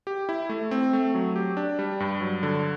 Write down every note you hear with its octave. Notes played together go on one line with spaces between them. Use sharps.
G4
E4
A3
C4
A3
F#3
G4
D4
G3
G2
F#3
D3